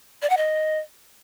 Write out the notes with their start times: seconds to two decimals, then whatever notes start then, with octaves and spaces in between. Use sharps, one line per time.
0.22 D5
0.30 F#5
0.37 D#5